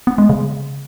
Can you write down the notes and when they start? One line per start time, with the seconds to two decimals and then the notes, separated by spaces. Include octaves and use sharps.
0.07 B3
0.18 G#3
0.29 C#3